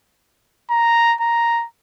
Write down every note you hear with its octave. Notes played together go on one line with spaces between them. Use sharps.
A#5
A#5